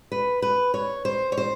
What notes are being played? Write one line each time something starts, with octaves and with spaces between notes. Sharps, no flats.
B4
B4
C#5
C5
C#5
C5